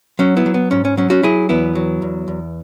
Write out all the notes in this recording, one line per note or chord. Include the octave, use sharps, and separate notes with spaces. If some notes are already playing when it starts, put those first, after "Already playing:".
F#3 C#4
B3 E4
F#3
B3
G#2 C#4
C#4
F#3 C#4
C#4 F#4
F#3 E4 G#4
E2 B3 E4
F#3
E2
E2